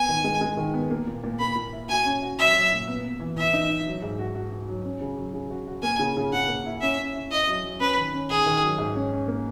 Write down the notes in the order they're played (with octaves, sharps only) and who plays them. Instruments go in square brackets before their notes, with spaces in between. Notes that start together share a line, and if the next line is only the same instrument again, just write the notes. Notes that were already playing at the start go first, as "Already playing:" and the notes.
Already playing: [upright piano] B3 [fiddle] G#5
[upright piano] D#3
G#3
G#3
D#3
B3
A#3
A#2
A#2
[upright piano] A#3 [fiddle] B5
[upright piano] A#2
E4
[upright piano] F#4 [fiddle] G#5
[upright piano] C#4
F#4
[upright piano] F#3 [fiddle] E5
[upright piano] F#3
A#2
B3
B3
E3
[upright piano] E3 [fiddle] E5
[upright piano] D#4
D#4
F#3
G#2
F#4
F#4
F#4
F#3
C#4
C#3
F#3
C#3
F#4
F#4
[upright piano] A#3 [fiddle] G#5
[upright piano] C#3
C#3
[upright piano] C#3 [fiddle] F#5
[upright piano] A#3
E4
[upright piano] C#4 [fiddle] E5
[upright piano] C#4
E4
[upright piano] E4 [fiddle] D#5
[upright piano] F#3
F#3
[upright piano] C#4 [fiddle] B4
[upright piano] D#3
C#4
[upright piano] D#3 [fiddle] G#4
[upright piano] D#3
F#3
G#2
C#4
C#4
A#3